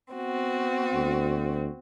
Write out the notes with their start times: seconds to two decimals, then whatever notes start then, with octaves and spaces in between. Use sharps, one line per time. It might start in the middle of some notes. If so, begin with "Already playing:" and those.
0.15 B3 C4 F#4
0.93 D2